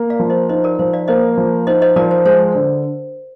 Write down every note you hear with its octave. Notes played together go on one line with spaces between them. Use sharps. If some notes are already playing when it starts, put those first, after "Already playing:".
Already playing: A#3
D5 F5
F3
C5 D#5
D#4 C5 D#5
A#4 D5
F3 C5
D5 F5
A#3 C5 D#5
F3
D#4 C5 D#5
C5 D#5
F3 A#4 D5
C5
G#3 C5
D3